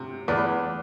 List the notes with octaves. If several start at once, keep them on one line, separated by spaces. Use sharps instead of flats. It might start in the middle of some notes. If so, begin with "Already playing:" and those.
Already playing: C3
E2 B4 D5